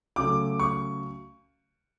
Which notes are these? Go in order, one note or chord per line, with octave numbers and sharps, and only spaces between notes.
C#3 F#3 A3 D6
C#6